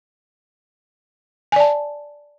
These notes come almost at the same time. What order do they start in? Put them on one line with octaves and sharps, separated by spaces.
G#5 D5 A5